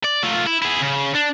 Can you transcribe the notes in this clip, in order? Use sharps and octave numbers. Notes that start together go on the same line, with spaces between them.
D5
A3 F4
E4
E4 G#4
C#3
D4